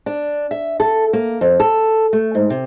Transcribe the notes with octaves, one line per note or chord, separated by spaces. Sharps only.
D4
E5
A4
A#3
F2
A4
A3
G#2
C3